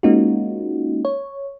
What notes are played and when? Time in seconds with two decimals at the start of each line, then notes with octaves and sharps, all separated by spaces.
0.03 G#3 A#3 C#4 D#4 F4 F#4
1.05 C#5